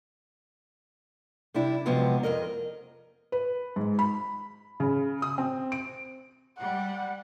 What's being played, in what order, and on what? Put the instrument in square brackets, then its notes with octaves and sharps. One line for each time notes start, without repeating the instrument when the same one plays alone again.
[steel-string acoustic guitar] C3 G3 D4 E4
C3 F3 F#3 G#3 B3 C4
F2 G#2 A#4 D#5
[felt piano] B4
G#2
B5
C#3
D#6
C4
D7
[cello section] G3 [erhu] F#5